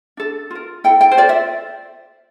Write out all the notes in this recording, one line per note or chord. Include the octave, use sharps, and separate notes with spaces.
D4 A4
F4 A#4
E4 A4 G5
G5
C5
F4 A4 D5
E5